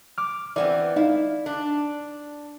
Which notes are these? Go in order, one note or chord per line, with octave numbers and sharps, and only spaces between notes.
D6 F6
E3 B3 C4 D5
D#4 E4 F5
D4